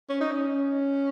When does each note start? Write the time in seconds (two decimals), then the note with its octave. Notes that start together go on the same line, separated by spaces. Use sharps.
0.09 C#4
0.21 D#4
0.32 C#4